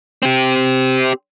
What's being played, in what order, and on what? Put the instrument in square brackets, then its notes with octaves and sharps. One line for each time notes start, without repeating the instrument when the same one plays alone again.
[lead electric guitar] C4 G4